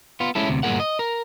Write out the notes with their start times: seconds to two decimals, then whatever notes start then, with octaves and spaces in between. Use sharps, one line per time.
0.20 B3 F4
0.35 G#3 C#4 E4 A4
0.48 D2 C3
0.63 D2 G2 A#2 G#4 A#4 F#5
0.80 D#5
0.99 A#4